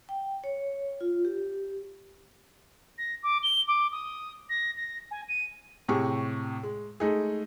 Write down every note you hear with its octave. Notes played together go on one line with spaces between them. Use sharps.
G5
C#5
F4
G4
A#6
D6
G7
D6
D#6
A#6
A#6
G#5
D#7
A2 C3 G4 G#4 C#6
G#3
G#3 A3 D#4 G#4